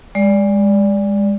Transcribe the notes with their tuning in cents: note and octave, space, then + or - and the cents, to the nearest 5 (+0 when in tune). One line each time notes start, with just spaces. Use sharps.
G#3 -30 D5 -10